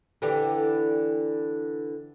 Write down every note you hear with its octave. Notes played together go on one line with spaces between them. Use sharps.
D3 E3 G4